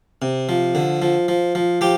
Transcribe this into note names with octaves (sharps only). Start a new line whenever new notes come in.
C3
F3
D3
F3
F3
F3
F3 G4